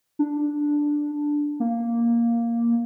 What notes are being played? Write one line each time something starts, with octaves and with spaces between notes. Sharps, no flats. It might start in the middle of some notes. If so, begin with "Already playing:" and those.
D4
A#3